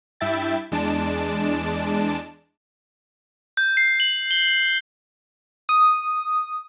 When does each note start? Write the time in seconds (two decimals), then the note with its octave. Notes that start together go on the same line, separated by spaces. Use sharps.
0.21 G2 E4 E5 G5 A6
0.72 E2 G#3 D4 A5 D7 E7
3.57 G6
3.77 C7
4.00 F#7
4.31 G7
5.69 D#6